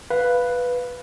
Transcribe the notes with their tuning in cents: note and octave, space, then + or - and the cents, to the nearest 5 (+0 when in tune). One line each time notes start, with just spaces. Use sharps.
B4 +0 F5 +0